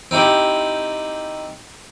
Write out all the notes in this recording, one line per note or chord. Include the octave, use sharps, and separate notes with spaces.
C4 D#4 E4 G4